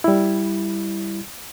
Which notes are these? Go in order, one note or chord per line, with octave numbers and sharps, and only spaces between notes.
G3 E4